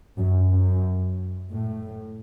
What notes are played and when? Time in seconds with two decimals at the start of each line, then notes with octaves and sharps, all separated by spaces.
0.17 F#2
0.50 F#2
1.50 A2